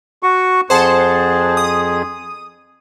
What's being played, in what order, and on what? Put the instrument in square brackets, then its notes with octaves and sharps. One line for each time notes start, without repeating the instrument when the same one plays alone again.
[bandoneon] F#4 C#6
[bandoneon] F2 G#4 [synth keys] C5 F#5 A5
[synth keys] D#6